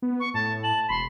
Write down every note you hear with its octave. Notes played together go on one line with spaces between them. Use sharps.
B3
C#6
A2 A5
A5 F#7
E1 B5 C6